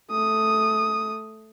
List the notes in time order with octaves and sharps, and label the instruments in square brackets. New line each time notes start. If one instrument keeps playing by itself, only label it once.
[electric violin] A3 D#6